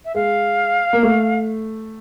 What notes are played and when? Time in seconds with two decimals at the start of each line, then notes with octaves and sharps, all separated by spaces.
0.05 E5
0.15 G#3 F5
0.93 A#3
1.03 A3